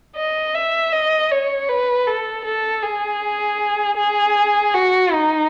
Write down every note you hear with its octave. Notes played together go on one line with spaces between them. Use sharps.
D#5
E5
D#5
C#5
B4
A4
A4
G#4
G#4
F#4
D#4